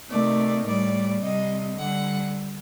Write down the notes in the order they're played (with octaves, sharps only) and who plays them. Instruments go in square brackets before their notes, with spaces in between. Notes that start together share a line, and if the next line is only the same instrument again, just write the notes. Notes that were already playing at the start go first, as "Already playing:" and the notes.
[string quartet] C3 D#3 A3 D5
A2 G3 D5
C3 G3 D#5
D3 G3 F#5